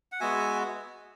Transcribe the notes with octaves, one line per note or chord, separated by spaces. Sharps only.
F#5
G#3 B3 F#4 E5 G#5